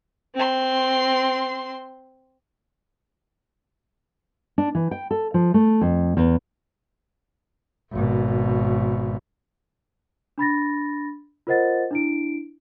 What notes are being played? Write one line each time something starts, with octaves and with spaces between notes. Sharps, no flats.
C4 C6
D4
E3
G5
A4
F3
A3
F2
E2
G#1 B2
D4 B5 A6 A#6
F4 A#4 C5 D#5 F#5 A6
D4 E4 D7